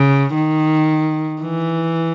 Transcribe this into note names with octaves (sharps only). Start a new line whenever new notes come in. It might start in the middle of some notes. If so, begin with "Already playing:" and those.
Already playing: C#3
D#3
E3